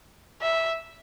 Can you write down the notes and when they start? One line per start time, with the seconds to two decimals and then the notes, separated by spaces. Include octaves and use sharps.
0.42 E5